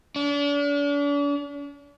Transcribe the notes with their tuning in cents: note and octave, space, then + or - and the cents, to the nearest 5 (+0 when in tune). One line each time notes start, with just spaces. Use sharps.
D4 -40